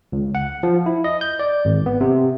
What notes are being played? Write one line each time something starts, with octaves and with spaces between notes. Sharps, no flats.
C#2
F#5
F3
E4
D#5
G6
D5
G#1
B3
C3